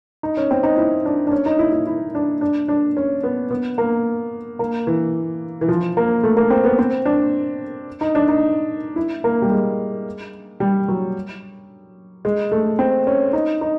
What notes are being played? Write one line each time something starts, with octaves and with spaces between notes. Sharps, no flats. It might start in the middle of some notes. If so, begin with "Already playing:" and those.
D#4
C#4
C4
D#4
E4
D4
D4
C#4
D#4
E4
E4
E4
D4
D4
D4
C#4
B3
B3
A#3
A#3
E3
E3
F3
A#3
A3
A#3
C4
B3
C4
D4
D#4
D4
D#4
E4
A#3
G3
G#3
G3
F#3
G#3
A3
C4
C#4
D#4
D#4